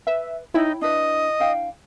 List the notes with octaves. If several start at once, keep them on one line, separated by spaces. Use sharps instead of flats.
B4 E5
D#4 E4 C#5 G5 B5
D4 B4 D#5
D4 F5 G5